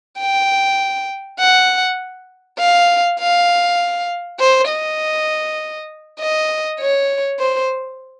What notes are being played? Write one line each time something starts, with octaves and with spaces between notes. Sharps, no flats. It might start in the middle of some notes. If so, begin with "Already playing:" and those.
G5
F#5
F5
F5
C5
D#5
D#5
C#5
C5